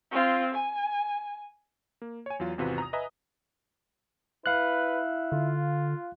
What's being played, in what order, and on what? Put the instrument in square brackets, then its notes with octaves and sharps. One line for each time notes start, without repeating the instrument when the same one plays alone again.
[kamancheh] C4 F4
G#5
[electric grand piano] A#3
C#5 G#5
E2 F#3 F4
G#1 E2 C3 F4 F#4 B4
A#5 D#6
B4 D#5 E5 G#5 A#5
[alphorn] E4 [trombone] B4 [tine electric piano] F5 F#6
[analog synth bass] D3 [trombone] F4